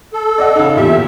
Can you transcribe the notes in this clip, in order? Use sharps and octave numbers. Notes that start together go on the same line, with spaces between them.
A4
D5 D#5 F#5
C#3 D#4
E2 A#2 G4 E5